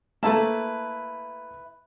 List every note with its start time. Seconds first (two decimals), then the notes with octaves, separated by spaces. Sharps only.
0.23 A3 A#3 E4 B4 A5